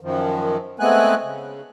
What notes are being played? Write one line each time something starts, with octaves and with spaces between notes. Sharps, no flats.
F#2 D#3 F3
G#3 A3 B3 C4 G#5 F#6
C#3